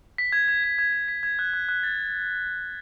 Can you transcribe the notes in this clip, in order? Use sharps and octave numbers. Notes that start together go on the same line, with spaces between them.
B6
G#6
G#6
G#6
G#6
G#6
B6
G#6
F#6
F#6
F#6
A6